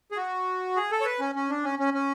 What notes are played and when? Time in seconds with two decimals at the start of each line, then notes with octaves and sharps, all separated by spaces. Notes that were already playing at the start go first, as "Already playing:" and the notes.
0.12 G#4
0.17 F#4
0.76 G#4
0.91 A4
1.01 C#5
1.05 B4
1.20 C#4
1.35 C#4
1.50 D4
1.64 C#4
1.79 C#4
1.94 C#4